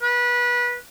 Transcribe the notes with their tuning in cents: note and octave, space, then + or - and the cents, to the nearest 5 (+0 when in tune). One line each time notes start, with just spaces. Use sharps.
B4 -25